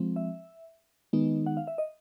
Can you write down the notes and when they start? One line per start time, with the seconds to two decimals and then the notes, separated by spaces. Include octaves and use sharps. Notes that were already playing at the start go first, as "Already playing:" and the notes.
Already playing: F3 G#3 C4
0.16 E5
1.13 D#3 G#3 B3 D#4
1.46 F#5
1.57 F5
1.67 E5
1.78 D#5